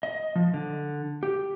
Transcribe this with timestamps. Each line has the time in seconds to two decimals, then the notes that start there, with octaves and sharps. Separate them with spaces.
0.03 D#5
0.35 F3
0.54 D3
1.23 G4